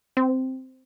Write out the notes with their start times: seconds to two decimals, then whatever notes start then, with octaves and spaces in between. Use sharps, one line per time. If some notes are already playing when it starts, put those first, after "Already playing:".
0.17 C4